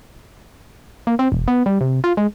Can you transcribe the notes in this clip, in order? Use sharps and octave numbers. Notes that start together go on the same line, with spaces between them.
A#3
C4
E1
B3
G3
C3
F4
G#3